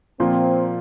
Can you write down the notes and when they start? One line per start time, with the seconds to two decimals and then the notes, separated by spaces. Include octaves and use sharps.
0.20 A#2 F3 A#3 C4 F4